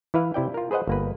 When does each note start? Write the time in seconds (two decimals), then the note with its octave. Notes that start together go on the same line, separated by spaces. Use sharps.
0.14 E3 E4 B4 F5
0.34 C3 E4 D5 G5
0.54 F4 A#4
0.71 G#4 B4 C5 D#5 F#5
0.87 G1 A#3 B4